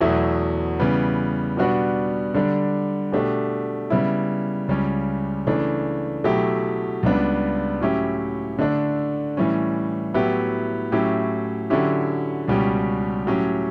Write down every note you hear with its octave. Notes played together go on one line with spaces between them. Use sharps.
E2 B2 F#3 A3 E4
C#3 E3 G3 B3
B2 G3 B3 D4 F#4
D3 G3 D4
B2 A3 D4 G4
C#3 G3 B3 E4
C#2 C#3 G3 C#4
C#3 E3 A3 D4
B2 F#3 A3 E4 G4
C#2 C#3 G3 B3 D4
A2 F#3 C#4 E4 G4
D3 A3 D4
A2 E3 G3 C#4
A2 F#3 B3 E4 G4
A2 F#3 C#4 E4 G4
D3 F#3 C#4 E4 G4
C#2 B2 G3 C#4 G4
A2 F#3 C#4 G4